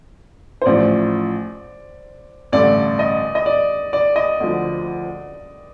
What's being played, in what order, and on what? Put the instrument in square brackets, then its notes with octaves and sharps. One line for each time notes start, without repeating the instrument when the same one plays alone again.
[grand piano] C5
[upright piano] A1 A2 F3 [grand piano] D5
[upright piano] A1 G2 D3 A3 [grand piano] D5
[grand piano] D#5
D#5
D5
D5
D#5
[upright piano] D2 D3 F3